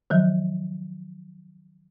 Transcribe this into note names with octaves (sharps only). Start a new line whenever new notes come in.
D#3 F3 F#3